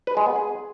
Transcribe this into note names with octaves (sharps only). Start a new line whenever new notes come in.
B4
G#3
B3
G#4